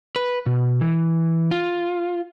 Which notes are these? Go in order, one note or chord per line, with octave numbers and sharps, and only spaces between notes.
B4
B2
E3
F4